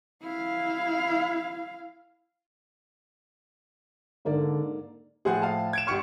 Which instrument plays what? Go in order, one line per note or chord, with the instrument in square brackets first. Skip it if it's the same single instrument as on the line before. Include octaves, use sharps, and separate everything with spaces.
[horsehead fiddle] E4 F5
[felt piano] G#2 A#3 D5 [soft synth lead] D3
[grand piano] A2 F3 [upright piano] G#4 C5 F#5
[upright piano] F5 A5
[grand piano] G#6 D7 E7
[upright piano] G#1 G4 F6 [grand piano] C6 C#6 C#7